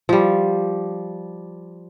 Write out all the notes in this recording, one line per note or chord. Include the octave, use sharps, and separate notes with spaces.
F3 G3